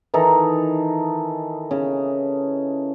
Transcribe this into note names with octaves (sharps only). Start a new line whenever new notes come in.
D#3 E3 D#4 A4
C#3